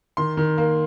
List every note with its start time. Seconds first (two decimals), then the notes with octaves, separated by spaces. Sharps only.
0.17 D#3 C6
0.37 D#3
0.58 A#3